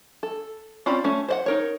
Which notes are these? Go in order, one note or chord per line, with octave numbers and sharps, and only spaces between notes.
A4
C4 C#4 F4 D5 B5
A3 C#4
C5 D5 F#5
D#4 A#4 C#5